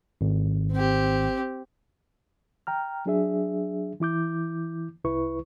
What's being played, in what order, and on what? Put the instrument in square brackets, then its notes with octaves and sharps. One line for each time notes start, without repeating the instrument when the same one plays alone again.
[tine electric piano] G#1
[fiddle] C4 G4
[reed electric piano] G5 A#5 F6
F#3 D4 G#4 E5
E3 E4 D6 G6
C2 E4 B4 C#6